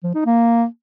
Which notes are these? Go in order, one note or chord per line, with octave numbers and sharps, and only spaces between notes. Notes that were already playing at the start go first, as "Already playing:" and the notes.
F3
D#4
A#3